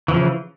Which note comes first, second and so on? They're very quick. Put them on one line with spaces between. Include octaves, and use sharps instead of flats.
E3 F3 C#3